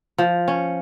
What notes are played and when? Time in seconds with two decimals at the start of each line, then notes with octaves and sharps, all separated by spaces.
0.18 F3
0.48 C#4